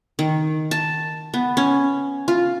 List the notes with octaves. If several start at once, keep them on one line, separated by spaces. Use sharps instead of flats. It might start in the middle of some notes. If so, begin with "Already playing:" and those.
D#3
A5
B3
C#4
F4